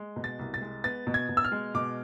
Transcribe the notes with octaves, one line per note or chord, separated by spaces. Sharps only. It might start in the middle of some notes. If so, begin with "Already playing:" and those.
Already playing: G#3
B2
A6
C2
A6
G#3
B3 A6
B2
G#6
B2
E6
F6
G#3
B2 D6